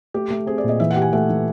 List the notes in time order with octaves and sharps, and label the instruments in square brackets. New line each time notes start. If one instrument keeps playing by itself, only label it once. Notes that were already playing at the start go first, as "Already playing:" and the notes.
[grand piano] A3 [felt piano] G4
[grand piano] A3
[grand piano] C4 [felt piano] G#4
[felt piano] D5
[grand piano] A#2 [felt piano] D#5
[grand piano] E3 [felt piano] E5
[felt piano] F#5
[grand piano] G4
[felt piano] G#5
[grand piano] A3 [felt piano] F#5
[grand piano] E3